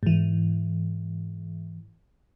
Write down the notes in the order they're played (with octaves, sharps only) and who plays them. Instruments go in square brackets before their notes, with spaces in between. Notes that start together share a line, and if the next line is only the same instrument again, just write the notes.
[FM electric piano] G#2 E3